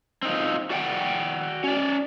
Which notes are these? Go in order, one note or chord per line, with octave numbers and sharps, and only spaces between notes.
C4 D#4 F4
F#4 D5 F#5 G5
C#4 D5